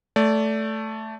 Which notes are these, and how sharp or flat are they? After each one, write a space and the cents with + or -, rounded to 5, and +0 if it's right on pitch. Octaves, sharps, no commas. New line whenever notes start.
A3 +0 D5 -25